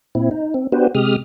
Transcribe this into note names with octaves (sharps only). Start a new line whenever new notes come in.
A#2 C4 E4
D#4
C4
B3 D4 F#4 G4 B4 C5
C3 G#3 G4 D#6 F6